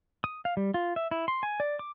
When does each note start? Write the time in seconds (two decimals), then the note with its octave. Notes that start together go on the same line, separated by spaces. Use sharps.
0.24 D#6
0.45 F5
0.57 G3
0.74 F4
0.96 E5
1.11 E4
1.28 C6
1.43 G#5
1.60 D5
1.79 D6